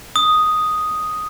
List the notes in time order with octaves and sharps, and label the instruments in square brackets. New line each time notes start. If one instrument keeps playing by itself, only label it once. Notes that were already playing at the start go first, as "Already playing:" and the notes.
[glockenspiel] D#6